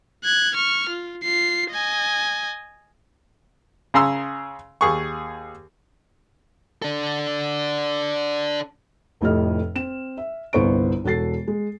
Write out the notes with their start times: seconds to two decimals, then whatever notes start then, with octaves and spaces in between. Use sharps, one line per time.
0.24 F#6 G#6
0.55 C#6 F6
0.89 F4
1.23 F4 C7
1.72 D#5 G#5
3.94 C#3 G#4 A#5 C6 E6
4.81 D#2 G#4 C#6
6.82 D4 A4
9.21 F1 F2 A2 G4 D#5 F6
9.75 C4 E7
10.17 E5
10.53 G1 C2 B3 C5 C#6 D7
11.04 E1 F#4 A4 A6 C7
11.47 G#3